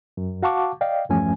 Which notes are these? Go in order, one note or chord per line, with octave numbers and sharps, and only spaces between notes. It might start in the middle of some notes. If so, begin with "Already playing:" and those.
F#2
F#4 F5 F#5 A5 C#6 D6
D5 D#5 F5 G5
E2 G2 F3 A3 C#4 G#5